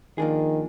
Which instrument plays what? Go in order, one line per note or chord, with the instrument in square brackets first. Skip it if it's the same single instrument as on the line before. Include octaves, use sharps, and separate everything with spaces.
[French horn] D#3 [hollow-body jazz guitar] F3 A#3 D4 G#4